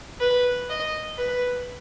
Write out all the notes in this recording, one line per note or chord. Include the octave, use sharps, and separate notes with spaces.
B4
D#5
B4